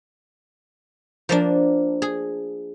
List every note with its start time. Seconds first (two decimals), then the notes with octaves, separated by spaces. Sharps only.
1.29 F3 A#3 D4
2.02 G#4